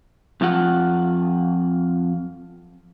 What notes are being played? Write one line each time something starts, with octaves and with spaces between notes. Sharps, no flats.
F2 F3 F4 F#5